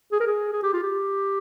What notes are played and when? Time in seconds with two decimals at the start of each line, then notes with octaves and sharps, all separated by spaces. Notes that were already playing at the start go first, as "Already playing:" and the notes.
0.12 G#4
0.20 A#4
0.27 G#4
0.53 G#4
0.63 G4
0.73 F4
0.83 G4